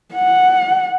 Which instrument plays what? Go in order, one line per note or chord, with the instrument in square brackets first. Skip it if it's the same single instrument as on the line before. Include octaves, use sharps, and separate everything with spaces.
[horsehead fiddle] F#5